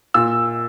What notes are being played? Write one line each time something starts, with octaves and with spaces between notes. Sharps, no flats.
A#2 E6